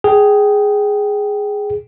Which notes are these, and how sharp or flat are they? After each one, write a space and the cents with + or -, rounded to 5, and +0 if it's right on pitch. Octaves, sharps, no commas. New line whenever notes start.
G#4 +0 G5 -20